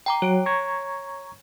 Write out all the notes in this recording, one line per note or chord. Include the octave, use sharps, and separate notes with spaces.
G5 A#5 D6
F#3 C#5 D7
A#5 C#6 G#6